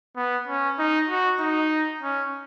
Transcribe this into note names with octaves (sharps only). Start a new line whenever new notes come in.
B3
C#4
D#4
F#4
D#4
C#4